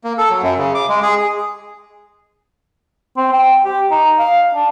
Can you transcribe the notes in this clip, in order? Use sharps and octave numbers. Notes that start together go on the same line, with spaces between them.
A#3
A4
F#3
F#2
C#3
D6
G#3
G#4
C4
G5
G4
D#4
F5
D4